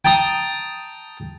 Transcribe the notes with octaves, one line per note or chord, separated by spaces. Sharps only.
G5 A5 A#5 D#6